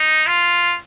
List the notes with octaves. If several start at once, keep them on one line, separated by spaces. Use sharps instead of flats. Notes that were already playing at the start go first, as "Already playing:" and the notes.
Already playing: D#4
F4